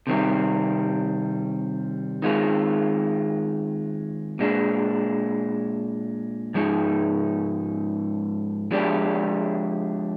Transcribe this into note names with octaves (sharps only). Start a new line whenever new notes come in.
C3 D#3 G3 C4
D#3 G#3 C4 F4
A#2 G#3 D4
G#2 F3 G#3 D#4
F3 G#3 D4 G4 D5